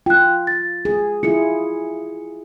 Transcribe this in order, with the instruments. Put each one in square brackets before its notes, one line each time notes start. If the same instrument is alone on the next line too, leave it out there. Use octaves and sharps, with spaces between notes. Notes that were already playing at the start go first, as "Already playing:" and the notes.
[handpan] F4 [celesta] G5 F#6
[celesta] A6
[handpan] G#4
[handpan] E4 F4 G#4 [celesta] C#7